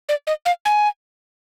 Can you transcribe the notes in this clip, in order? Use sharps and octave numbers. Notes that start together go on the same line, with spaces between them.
D5
D#5
F5
G#5